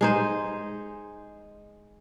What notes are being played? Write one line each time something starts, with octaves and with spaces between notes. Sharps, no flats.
G#3 D#4 C5